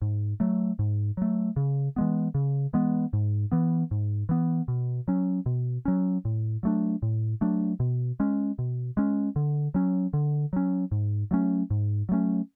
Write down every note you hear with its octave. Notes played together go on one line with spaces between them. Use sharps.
G#2
F#3 A3
G#2
F#3 A3
C#3
E3 G#3 B3
C#3
E3 G#3 B3
G#2
E3 B3
G#2
E3 B3
B2
F#3 C#4
B2
F#3 C#4
A2
F#3 A3 D4
A2
F#3 A3 D4
B2
G#3 C#4
B2
G#3 C#4
D3
F#3 C#4
D3
F#3 C#4
G#2
F#3 A3 C#4
G#2
F#3 A3 C#4